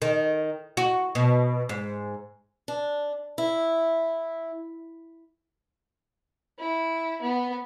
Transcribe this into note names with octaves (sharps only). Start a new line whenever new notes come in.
D#3
F#4
B2
G#2
D4
E4
E4
B3